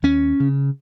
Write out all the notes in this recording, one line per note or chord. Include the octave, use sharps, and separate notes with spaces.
D#2 C#4
C#3